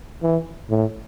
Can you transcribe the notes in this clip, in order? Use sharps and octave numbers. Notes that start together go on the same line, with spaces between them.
E3
A2